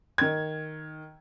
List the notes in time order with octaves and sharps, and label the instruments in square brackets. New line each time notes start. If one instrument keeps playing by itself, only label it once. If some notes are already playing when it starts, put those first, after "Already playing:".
[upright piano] D#3 G#6